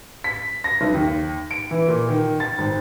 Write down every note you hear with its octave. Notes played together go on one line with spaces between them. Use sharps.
B6
A#6
B1
D#2
D7
E3
A#2
D#3
A6
G#1